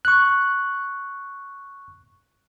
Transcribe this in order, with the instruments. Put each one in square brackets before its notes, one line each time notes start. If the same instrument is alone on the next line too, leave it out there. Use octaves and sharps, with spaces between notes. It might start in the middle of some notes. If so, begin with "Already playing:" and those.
[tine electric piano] C#6 F#6